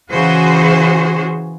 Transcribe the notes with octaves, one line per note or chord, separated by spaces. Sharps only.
C#3 E3 F#4 G#4 C5